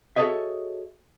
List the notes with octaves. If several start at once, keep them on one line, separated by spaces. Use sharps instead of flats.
F#4 G#4 A4 C#5 D#5 E5